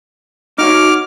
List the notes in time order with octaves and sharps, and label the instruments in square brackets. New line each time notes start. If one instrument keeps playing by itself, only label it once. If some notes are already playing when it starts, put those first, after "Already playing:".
[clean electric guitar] D#4 F#4 C#5 [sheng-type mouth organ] D6 F6